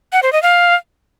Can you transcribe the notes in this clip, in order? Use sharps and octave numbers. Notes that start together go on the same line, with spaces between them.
F#5
C5
D#5
F5